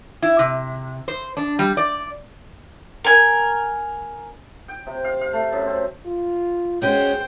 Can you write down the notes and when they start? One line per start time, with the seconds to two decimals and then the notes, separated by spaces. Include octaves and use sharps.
0.22 E4
0.39 C3
1.08 C5
1.37 D4
1.59 G3
1.77 D5
3.04 A#4 G#5
4.68 G5
4.87 C3
5.04 F5
5.21 F5
5.33 A3
5.53 F#2
5.66 C4
6.06 F4
6.82 G#3 C#4 F#4 G#4 C5 G5